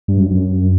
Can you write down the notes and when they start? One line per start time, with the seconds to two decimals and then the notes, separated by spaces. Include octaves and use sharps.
0.08 G2
0.20 F#2
0.31 F#2